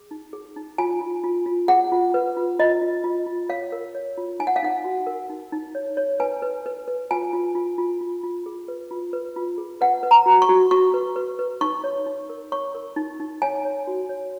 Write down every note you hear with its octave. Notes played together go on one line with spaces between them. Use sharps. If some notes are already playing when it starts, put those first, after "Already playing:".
Already playing: G#4
D#4
G#4
D#4
F4 G#5
F4
F4
F4
G#4 F#5
F4
B4
F4
F4 D#5
F4
F4
F4
C#5 F5
A#4
C#5
F4
D#4 G#5
F#5
F5
D#4 F#5
F#4
A#4
D#4
D#4
C#5
C#5
B4 G#5
B4
B4
B4
F4 G#5
F4
F4
F4
F4
F4
G#4
B4
F4
B4
F4
G#4
B4 F#5
B4
A#5
F#4
C#6
F#4
F#4 C#6
B4
B4
B4
D#4 C#6
C#5
D#4
A#4
C#5 C#6
A#4
D#4
D#4
C#5 G#5
C#5
F#4
C#5